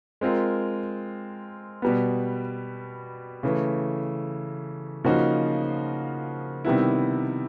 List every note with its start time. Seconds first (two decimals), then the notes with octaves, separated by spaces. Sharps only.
0.21 G#3 C4 F4 A#4
1.82 B2 G3 B3
3.43 C#3 E3 A3
5.04 C#3 F3 A#3 D#4 F#4
6.65 C3 D#3 G3 B3 E4